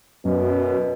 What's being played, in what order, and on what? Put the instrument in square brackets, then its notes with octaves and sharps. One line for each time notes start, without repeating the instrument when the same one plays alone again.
[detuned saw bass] F#2 [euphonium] B2